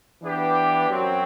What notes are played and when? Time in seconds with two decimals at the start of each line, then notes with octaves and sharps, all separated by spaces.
0.22 E3 B3 D4 G4
0.89 F#2 F#3 C4